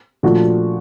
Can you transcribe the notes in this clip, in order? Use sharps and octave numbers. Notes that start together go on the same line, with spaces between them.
A#2 F3 A3 D4 F#4